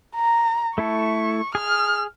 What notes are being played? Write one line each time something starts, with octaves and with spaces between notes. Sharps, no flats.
A#5
A3 E4 A4 C#6
G#4 D#6 F6